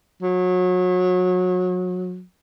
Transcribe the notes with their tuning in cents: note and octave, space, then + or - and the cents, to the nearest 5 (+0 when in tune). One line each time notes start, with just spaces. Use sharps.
F#3 -30